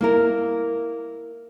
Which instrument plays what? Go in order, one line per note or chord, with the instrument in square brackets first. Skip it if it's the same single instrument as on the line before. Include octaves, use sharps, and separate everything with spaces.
[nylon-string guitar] A#3 E4 A#4